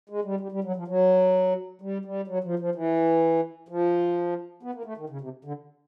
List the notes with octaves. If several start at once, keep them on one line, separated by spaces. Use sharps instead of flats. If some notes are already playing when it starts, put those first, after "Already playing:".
G#3
G3
G3
G3
F#3
F3
F#3
G3
G3
F#3
F3
F3
E3
F3
B3
A#3
A3
D#3
C#3
C3
D3